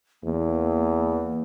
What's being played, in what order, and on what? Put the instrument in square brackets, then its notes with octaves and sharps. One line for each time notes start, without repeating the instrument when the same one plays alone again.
[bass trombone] E2 [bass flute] A#3